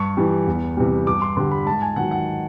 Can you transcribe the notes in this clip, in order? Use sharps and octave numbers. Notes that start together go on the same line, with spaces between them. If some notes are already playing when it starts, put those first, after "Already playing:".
Already playing: G2 C#6
E3 G3
E2
C3 E3 G3
G2 D6
C6
D3 G3 C6
B5
G#2 A5
G#5
D#3 F#3 F#5
F#5